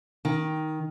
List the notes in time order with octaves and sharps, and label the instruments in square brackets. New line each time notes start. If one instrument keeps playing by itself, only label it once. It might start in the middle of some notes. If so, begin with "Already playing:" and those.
[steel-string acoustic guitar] D#3